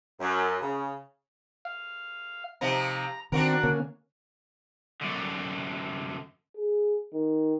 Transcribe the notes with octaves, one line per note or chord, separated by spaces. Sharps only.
F#2
C#3
F5
C3 F3 D#4 A#5
D#3 C4 D4 F#4 A#4
D3 A#3 C#4
F#2 D3
G#4
D#3